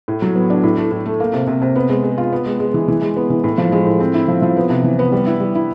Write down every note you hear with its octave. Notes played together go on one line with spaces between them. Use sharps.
A2
F#3
B3
D4
A2
A3
A2
A3
A#3
C3
C3
C3
B3
G#3
G#3
F4
B3
G#3
G#3
E3
E3
G#3
B3
E3
A2
F3
G#3
A2
C4
E4
F3
F3
B3
C3
E3
B3
G3
E4
G3
E4